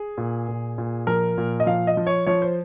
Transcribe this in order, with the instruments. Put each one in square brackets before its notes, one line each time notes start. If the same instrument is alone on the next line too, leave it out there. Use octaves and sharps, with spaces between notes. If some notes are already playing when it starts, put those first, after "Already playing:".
Already playing: [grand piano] G#4
A#2
A#2
A#2
F3 A#4
A#2
D#5
F3 F5
D#5
F3
C#5
F3 C#5
C5